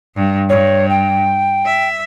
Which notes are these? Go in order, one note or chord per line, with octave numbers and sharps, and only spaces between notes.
G2
G2 C#5
G5
E5